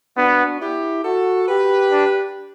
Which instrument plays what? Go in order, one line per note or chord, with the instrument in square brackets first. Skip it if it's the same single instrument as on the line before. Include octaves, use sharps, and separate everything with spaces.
[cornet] B3 [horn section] D4 F#4
[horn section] E4 G4
F#4 A4
G4 B4
[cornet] D4